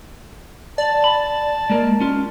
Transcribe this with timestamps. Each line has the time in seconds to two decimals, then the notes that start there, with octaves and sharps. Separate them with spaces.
0.78 D5 A5
1.04 B5
1.70 G#3 A#3 A#4
2.00 C#4 F4